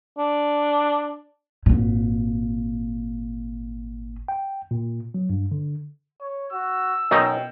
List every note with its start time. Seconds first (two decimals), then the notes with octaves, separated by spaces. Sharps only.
0.18 D4
1.66 G#1 A#2
4.28 G5
4.71 A#2
5.14 F#3
5.30 G2
5.52 D3
6.21 C#5
6.53 F#4 E6
7.11 F#2 B2 F#3 D#4 G5